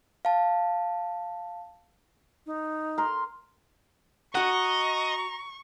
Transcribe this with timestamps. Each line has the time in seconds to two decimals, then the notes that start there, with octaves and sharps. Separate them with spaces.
0.25 F5 A5
2.46 D#4
2.98 A#4 C6
4.35 F#4 D#5 F#5 A#5 C#6